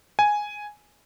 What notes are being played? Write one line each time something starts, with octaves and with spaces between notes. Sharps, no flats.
G#5